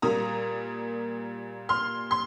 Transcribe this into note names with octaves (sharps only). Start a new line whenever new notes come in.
A#2 G3 A#3 A#5 D#6
C6 F6
C6